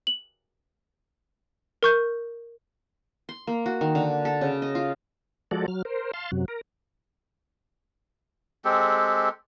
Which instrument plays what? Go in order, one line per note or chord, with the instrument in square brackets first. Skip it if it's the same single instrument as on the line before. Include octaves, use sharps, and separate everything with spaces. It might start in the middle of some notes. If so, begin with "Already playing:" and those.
[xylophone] F#7
A#4 C#6 G6
[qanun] C6
A#3
F#4
D#3
D3
A4
C#3
D#5
F4
[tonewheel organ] F3 G#3 F#4 A4 D5
F#3 F6
A#4 C5
F5 A5 C6
F#2 C3 F#3
A#4
[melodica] G#3 C4 G4 A4